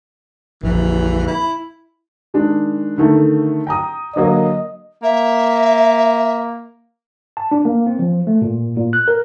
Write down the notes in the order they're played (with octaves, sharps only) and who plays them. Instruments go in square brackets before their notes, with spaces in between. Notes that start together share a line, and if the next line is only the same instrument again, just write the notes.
[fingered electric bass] A#1 F2 [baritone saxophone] E3
[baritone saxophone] E4
[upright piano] D#3 G#3 D4
D3 D#3 A3
G5 A#5 D#6
[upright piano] D3 F#3 A#3 [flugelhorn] D#5
[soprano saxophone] A#3 [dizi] E5
[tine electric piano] A5
D4
A#3
C4
F3
A3
A#2
A#2
F#6
A#4